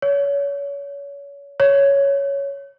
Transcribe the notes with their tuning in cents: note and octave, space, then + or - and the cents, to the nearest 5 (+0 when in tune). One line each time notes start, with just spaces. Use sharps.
C#5 +30
C#5 +5